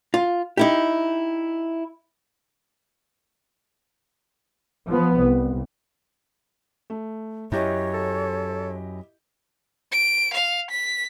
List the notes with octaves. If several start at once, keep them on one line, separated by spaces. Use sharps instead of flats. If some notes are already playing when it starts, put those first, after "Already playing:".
F4
D#4 E4 G4
F3 B3
C2
A3
F#2 E4 G4 C#5 D#5
A4
D7
F5
B6